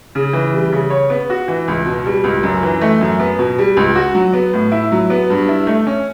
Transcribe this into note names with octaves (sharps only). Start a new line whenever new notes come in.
C#3
E3
G3
C#3
C#5
B3
F#4
E3
C#2
B2
G3
C#2
F#2
E3
A3
F#2
B3
B2
G3
C#2
F#4
F#3
B3
A2
E4
F#3
B3
G2
E4
A3
C#4